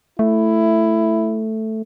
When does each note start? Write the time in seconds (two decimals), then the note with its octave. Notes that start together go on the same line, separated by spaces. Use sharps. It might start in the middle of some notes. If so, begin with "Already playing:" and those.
0.19 A3 E4